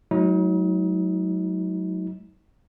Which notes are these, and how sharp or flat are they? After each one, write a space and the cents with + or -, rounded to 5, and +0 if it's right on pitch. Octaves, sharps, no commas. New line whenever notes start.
F#3 +0 A3 -45 D#4 +40